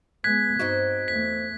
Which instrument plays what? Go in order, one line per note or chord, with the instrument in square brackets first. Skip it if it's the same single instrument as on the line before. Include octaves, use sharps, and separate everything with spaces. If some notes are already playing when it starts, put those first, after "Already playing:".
[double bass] G#3 B3 [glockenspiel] F#6 G#6 [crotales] B6
[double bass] G2 [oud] C4 D#4 F#4
[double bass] E2 A3 [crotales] B6